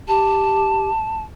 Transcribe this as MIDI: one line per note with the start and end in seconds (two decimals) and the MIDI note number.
0.07 0.89 67
0.07 1.22 81